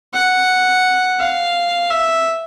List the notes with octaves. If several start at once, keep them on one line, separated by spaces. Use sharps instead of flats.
F#5
F5
E5